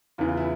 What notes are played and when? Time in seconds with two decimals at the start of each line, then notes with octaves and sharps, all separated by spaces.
0.18 E2 C#3 E3 F4
0.28 F4
0.37 E4